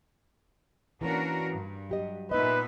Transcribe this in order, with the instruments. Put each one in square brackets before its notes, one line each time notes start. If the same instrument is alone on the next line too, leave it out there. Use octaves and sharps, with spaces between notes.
[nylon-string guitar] E3 A#3 C#4 [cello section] D4 F#4 A#4
[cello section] G2
[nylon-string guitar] F#3 G4 D#5
[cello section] A#2 B3 E5 [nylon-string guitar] D#4 D#5 [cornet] B4